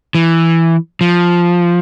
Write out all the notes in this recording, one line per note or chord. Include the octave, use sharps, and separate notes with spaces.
E3
F3